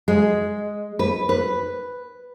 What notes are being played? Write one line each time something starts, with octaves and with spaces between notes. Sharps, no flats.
G#3
B4
B4